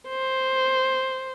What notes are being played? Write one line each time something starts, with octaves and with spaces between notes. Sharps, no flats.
C5